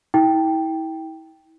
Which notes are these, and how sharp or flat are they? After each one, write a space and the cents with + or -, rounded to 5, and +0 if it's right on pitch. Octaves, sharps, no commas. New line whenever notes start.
E4 -35 G5 +0